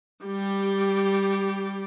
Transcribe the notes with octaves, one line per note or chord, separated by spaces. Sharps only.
G3 G4